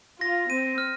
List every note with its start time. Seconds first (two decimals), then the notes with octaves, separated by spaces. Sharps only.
0.21 F4 A#6
0.49 C4 D#7
0.78 F6